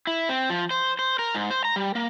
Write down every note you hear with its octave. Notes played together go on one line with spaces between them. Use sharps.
E4
C4
F3
C5
C5
A#4
G#2
C5
A#5
G3
A#3